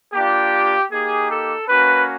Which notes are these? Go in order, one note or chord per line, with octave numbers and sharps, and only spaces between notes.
A#3 D4 F4 G4
A#3 D#4 G4 G#4
A4
A#3 C#4 F#4 B4